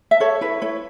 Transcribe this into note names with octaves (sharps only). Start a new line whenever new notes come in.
E5
A4 C#5
E4 B4
E4 C#5